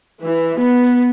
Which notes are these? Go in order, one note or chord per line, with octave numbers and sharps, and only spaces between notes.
E3
B3